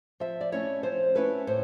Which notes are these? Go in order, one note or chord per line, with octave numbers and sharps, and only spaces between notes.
F3 E5
D5
A3 C#4 E4 C#5
F3 C5
A3 C#4 E4 B4
A2 C5